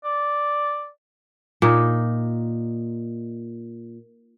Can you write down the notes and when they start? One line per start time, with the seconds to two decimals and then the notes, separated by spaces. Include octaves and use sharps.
0.04 D5
1.62 A#2 D#4